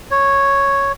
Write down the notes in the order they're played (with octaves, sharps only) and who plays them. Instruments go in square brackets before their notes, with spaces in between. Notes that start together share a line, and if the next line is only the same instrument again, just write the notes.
[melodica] C#5